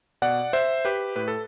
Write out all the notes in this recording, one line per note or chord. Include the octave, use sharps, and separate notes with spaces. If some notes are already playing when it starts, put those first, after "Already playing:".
B2 D5 F#5
C5 E5
G4 B4
A2 B4
A4